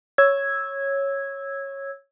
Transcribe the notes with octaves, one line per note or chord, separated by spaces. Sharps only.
C#5 E6 G#6